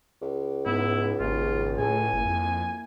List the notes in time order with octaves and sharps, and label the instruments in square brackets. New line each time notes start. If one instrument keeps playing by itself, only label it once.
[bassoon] C#2
[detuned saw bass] G#2 [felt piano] B3 [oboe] E4
[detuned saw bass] G#1 [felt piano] D#2 G#2 C#3 [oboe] F4
[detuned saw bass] A2 [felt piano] G#3 C#4 A4 [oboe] G#5
[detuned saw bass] F#1 [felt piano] A#3 E4
[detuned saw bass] F2